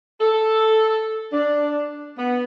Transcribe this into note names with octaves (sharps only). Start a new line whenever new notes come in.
A4
D4
B3